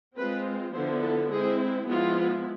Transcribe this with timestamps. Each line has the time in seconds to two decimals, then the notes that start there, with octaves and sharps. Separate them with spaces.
0.17 G#3 C4 F4 B4
0.74 D3 F3 B3 E4 C5
1.03 A4
1.31 G#3 C4 E4 G#4
1.88 F3 G#3 B3 E4 F4